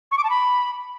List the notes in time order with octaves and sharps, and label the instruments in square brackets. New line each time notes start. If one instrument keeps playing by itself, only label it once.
[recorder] C#6
D6
A5
B5